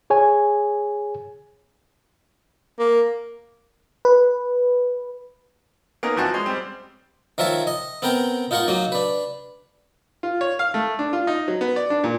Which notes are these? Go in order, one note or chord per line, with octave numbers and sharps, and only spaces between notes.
G#4 C#5 G#5
A#3
B4
A#3 B3 C#4 D#4 A#4
F#1 E3 F3 C4 F#4 A5
G#3 C#4
G3 C4
D#3 F3 A#4 C#5 E5 A5
D#5
B3 C4 A#4 G5 A#5
D#4 F4 A#4 F#5 C#6
F#3 A#3 D#4
D4 B4
F4
C#5
F5
A3
D4
F4
D#4
F#3
B3
D5
D4
A#2